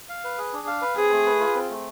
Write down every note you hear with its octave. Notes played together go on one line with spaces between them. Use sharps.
F5
B4
G#4
D4
F5
B4
C4 G#4
A3
B4
F4
C4
A3